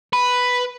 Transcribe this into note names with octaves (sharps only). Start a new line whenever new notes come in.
B4